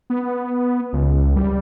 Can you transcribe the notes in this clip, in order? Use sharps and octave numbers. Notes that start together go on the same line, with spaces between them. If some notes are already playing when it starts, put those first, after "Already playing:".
B3
C#2
G3